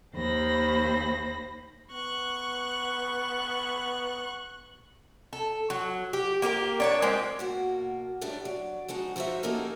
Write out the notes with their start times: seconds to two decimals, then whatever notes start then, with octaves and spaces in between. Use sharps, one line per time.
0.15 D#2 C5 B5 A#6
1.91 B3 C#6 F#6
5.33 A4
5.70 F#3
6.13 G4
6.42 A#3 G4 G#4 A#4
6.80 D4 C#5 A5
7.02 G#3 A#3 C4 G4
7.39 B2 A#3 F#4
8.21 F#2 A2 G3 D4 G4 E5
8.45 F#3 D5
8.88 F3 G#3 D#4 F#4
9.16 F3 D#4 F#4 C5 E5
9.43 A#3 C#4 D#4 G4 A4 A#4